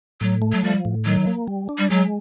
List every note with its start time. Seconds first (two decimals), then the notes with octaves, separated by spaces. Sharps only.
0.21 A2 F#3
0.42 A3
0.52 F#3
0.63 F3 G3
0.85 A2
1.05 D#3 F#3
1.27 A#3
1.48 G3
1.69 D4
1.78 G3
1.90 F#3 G#3